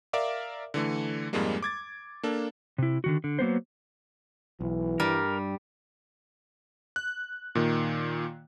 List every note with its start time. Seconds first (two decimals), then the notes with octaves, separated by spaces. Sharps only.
0.13 A#4 D5 E5 F5 D6
0.74 D3 E3 A3
1.33 F2 G#2 G3 G#3 A#3
1.63 D6 G#6 A6
2.23 A#3 D4 A4
2.78 C3 E4
3.04 D3 D#3 F#4
3.24 D3
3.39 F#3 A#3 B3 C5
4.61 B1 E3
5.00 G2 G3 A#4
6.96 F#6
7.55 A#2 D#3